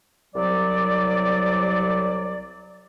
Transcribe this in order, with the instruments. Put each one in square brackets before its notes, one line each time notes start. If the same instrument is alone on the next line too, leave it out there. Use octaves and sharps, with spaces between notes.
[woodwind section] C2 F#3 D5